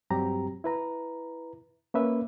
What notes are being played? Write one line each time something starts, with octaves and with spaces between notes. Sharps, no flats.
G2 F#3 G3 C4 G4 A#5
E4 B4 A#5
A#3 C#4 B4 E5